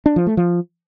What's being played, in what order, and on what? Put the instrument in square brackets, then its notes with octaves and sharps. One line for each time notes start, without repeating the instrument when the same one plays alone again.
[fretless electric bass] D4
F3
A3
F3